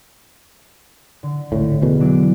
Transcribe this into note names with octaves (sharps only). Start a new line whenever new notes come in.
D3
G#1 C#2 A2
E2 B2
E3 F#3 D4